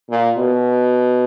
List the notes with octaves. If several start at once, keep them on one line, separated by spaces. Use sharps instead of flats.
A#2
B2